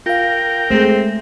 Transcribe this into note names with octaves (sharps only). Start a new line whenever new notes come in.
F4 A#4 F5 G5
G#3 A3 C4 G#4